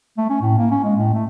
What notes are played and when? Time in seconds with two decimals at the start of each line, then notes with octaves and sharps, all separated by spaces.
0.18 A3
0.29 C#4
0.41 A2
0.58 A#3
0.71 C#4
0.84 G#3
0.96 A2
1.14 A3